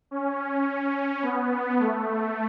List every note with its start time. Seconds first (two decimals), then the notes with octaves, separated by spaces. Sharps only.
0.11 C#4
0.39 C#4
1.22 B3
1.79 A3